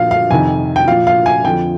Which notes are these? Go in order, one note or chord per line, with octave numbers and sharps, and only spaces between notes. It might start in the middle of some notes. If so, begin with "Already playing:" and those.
Already playing: A#2 F3 F5
F5
F2 C3 D#3 G#5
G5
A#2 F3 F5
F5
G#5
F2 D3 F3 G5